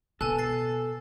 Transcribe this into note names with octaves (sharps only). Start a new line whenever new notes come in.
B2 A4 G#5 F#6
A6 C7